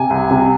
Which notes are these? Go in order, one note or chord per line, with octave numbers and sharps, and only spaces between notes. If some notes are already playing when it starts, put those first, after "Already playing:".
Already playing: C3 G#5
C2
C3